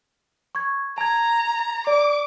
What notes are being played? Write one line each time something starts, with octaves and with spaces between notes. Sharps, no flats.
C#6 G#6
A5 A#5 G#6
D5 D6